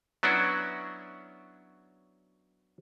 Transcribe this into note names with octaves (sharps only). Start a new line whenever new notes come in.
F#3 B3 C#4 D4 E4 F#4